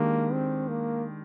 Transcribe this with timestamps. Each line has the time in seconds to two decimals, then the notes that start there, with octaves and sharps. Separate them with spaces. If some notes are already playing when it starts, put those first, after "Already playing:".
Already playing: D#3 G#3 A#3 D4 G4
0.33 C4
0.69 A#3